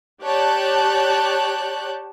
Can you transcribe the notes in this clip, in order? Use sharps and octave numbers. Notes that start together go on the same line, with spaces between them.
G4 C#5 D5 A5 F#6 G6